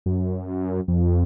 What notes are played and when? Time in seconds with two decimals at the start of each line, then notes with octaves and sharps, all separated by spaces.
0.06 F#2
0.88 F2